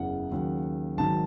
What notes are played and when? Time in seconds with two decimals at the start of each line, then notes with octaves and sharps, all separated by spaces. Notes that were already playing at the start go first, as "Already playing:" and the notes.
Already playing: F#1 E2 C#3 E3 F#5
0.31 D#2 C#3 F#3
0.97 G#1 G#2 D#3 F#3 A5